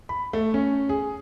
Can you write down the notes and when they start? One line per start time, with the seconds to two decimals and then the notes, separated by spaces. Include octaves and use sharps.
0.09 B5
0.33 A3
0.54 C#4
0.89 G#4